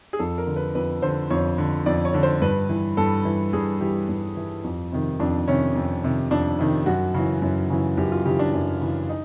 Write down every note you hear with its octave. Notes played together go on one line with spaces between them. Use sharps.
G#4
F2 A4
A#4
D3
B4
F2 B4
D3 C5
F2 C#5
D3
F2 D5
C#5
D3
C5
G2 B4
E3
G2 A4
E3
G2 G#4
E3 G4
G2
E3
F2
C3 D#3
F2 D4
C3 D#3 C#4
F2
C3 D#3
F2 D4
C3 D#3
F#2 F#4
C#3 E3
F#2
C#3 E3
F#2 G4
F4
C#3 E3 G4
D4
F#2
C#3 E3
D#4